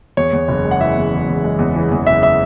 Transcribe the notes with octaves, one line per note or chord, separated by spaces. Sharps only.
E2 C#5
E2
F#1
G#3
F#5
E3 E5
E2
E2
E2
G#3
E2
E3
E2
F#1 E5
E5